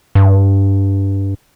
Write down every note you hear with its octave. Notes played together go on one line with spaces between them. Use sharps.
G2